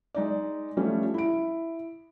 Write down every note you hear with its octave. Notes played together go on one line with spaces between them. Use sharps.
G#3 D#4 D5
F3 G3 A3 C#4
E4 D7